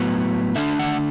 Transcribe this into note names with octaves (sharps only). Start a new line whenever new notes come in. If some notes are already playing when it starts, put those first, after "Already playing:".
Already playing: A2 F#3 B3
D3 A3 D4 E5
F#5